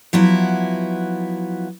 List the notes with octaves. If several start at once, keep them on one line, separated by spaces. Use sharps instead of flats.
F3 F#3 B3 E4